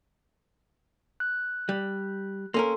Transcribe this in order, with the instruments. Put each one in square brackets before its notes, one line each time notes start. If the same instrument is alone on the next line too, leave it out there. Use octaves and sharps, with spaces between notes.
[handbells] F#6
[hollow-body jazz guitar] G3
[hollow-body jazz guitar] A#3 C#4 A#4 [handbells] A4 C6